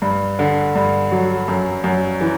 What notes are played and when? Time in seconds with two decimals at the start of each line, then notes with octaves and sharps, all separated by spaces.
0.02 G2
0.39 D3
0.75 G2
1.12 F#3
1.48 F#2
1.84 F#2
2.21 E3